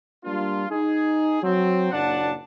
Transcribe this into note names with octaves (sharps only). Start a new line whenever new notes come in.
G3 A#3 D4 F4
D#4 G#4
F#3 C4
F#1 A#2 F#3 D4 F#5 A5